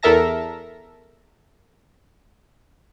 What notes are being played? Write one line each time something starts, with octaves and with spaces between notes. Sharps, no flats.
E2 A4 A#4 E5 A5 A#6